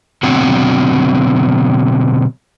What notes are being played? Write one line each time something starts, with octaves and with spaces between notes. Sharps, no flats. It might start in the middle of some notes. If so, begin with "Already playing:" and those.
B2 D3 F#3 C4 F#5